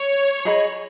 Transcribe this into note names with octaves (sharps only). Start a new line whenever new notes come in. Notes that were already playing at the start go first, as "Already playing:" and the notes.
Already playing: C#5
G#4 D#5 B5